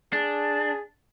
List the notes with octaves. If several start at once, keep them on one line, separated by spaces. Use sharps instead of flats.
D4 G#4